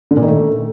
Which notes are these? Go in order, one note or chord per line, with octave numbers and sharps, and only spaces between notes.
D3
A#2
D#3
A3